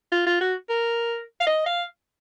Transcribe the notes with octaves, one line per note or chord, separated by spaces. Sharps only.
F4
F4
F#4
A#4
F5
D#5
F5